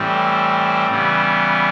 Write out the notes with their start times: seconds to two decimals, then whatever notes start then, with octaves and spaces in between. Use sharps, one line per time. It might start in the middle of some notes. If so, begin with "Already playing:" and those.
Already playing: A2 E3 G3 C4
0.88 C#3 E3 G3 B3